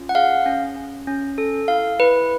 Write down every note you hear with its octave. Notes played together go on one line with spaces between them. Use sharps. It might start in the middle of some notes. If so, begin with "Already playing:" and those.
Already playing: C#4 F4
F#5
G#4 F5
C#4
C#4
C#4
A4
E4 F5
E4 B4